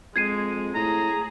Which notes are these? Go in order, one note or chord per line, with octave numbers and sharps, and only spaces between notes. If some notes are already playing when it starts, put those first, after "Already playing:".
F2 G#3 G#6 C7 D#7
A2 G#4 A#5